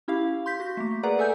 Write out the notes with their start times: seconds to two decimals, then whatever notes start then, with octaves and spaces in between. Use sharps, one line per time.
0.08 C#4 E4 G4 F5
0.46 C6 G6 B6
0.60 F#4 B6
0.77 A3 A#3
1.03 G#4 A#4 B4 D5 F#5 A#5
1.19 A4 E5 G#5 E6 G6